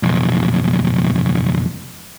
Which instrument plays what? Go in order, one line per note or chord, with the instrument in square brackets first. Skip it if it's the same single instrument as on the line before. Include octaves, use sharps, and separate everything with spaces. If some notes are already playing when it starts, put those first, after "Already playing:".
[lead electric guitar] B1 F2